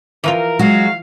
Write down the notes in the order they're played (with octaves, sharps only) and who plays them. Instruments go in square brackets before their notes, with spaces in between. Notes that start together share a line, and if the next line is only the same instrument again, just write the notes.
[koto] E3 F3 F4 [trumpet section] A#4
[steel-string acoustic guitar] F#3 G#3 F#4 [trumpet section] F5